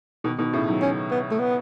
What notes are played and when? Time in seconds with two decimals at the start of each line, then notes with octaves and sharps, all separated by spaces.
0.24 B2 D#3
0.39 B2 D#3
0.53 A2 C#3
0.68 D#3 F#3
0.81 C#4
1.11 B3
1.31 A3
1.39 B3